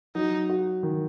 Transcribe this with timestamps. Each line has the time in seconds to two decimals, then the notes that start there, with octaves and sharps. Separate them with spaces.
0.15 F#3 D#4
0.49 F#4
0.83 D#3